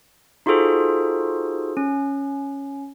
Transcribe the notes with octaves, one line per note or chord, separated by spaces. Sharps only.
D#4 F4 F#4 G#4 A4 C5
C#4